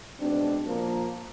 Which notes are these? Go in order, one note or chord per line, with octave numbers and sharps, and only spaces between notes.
G#2 B2 C4 D4
A#2 F3 A#3